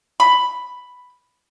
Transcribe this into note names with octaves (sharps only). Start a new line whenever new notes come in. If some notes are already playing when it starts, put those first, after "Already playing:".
B5